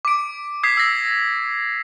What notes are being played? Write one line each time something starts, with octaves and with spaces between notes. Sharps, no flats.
D6 D7
D#6 G#6 B6 C7
E6 A#6